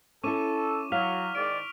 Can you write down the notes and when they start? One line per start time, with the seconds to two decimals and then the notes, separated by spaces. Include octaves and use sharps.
0.24 C#4 E4 A4 C#6 D6 D#7
0.92 F#3 F5 F6 B6 F7
1.35 G#2 D#3 D5 D7